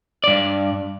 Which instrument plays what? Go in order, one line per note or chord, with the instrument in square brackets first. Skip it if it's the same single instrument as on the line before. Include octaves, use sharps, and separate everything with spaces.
[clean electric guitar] G2 D5